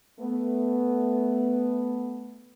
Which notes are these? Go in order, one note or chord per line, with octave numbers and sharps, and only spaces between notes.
A3 B3